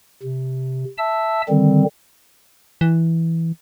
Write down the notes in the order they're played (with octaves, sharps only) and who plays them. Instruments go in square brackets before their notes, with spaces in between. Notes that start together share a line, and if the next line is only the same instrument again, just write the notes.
[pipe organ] C3
E5 A5 E6
D3 D#3 G3 C4
[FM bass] E3